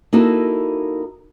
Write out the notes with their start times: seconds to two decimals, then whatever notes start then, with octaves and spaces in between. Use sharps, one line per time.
0.13 A#3 D#4 E4 F#4 A4